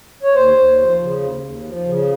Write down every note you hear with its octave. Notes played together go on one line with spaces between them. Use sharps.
C#5
D#2 C5
D#2
F3
C#3
D#2
D#2
F3
C#3